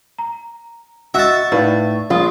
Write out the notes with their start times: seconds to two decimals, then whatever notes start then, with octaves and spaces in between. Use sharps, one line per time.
0.19 A#5
1.14 F#4 D#5 E5 A5 F#6
1.52 A2 D#4 E4 B4 D5 F5
2.10 A#1 F4 F5 D#6